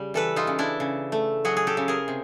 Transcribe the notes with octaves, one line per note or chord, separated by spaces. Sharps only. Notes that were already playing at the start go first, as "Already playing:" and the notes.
Already playing: C#3 G3
E3 A4 B4
D#4 F4
C#3
D4 E4
C#3
A3
F#3 F#4 G#4
G#4
G4 A4
C#3
G#4 A#4
C3